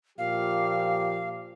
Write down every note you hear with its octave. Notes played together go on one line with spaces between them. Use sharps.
A#2 F3 G4 F5